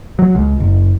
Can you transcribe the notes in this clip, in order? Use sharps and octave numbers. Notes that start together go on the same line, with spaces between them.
F#3
C#2
F#1